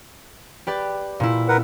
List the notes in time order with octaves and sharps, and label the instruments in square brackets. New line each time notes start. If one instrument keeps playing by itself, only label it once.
[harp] G4 B4 D5
A#2 E4
[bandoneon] A#4 B4 F#5